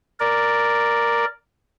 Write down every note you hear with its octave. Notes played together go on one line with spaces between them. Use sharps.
A#4 D5